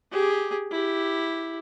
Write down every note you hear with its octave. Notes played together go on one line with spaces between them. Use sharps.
G4 G#4
E4 G4